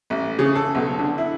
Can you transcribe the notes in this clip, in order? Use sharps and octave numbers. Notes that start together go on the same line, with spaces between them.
A1
C#3
A4
B1
D3
E4